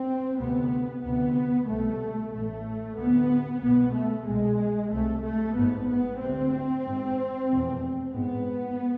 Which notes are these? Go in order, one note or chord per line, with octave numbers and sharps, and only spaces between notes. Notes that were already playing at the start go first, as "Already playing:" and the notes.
Already playing: C4
D2 C3 B3
D2 C3 B3
C2 B2 A3
A1 A2 A3
D2 C3 B3
C2 B2 B3
A3
C2 B2 G#3
C2 C3 A3
A3
G#1 G#2 B3
B3
D2 C3 C4
G#1 G#2
F1 E2 B2
G#1 G#2 B3